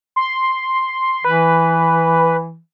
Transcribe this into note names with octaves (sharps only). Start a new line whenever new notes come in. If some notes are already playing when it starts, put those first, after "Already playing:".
C6
E3 B4